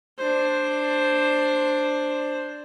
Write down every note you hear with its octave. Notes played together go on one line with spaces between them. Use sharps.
D4 C5